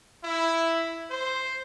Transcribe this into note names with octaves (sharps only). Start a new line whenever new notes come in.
E4
C5